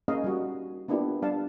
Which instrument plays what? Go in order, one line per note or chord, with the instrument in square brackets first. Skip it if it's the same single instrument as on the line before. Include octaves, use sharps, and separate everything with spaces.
[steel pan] A#3 C#4 D#4 G#4 D#5 F5
G3 F#4
A#3 B3 D4 E4 F4 G4
G3 D4 F5 A5